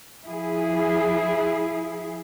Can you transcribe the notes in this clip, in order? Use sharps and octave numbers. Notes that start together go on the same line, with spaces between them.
F3 E4 G#4